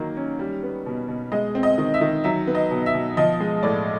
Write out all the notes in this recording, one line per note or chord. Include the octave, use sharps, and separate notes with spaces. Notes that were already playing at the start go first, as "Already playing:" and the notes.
Already playing: D#3 F#3 A#3
C#4
G3
B3
B2
B2
G#3 D#5
C4
D#5
D#3
E5
D#3
F#3 E5
B3
D#5
B2
E5
B2
F3 D#5
G#3
A2 D5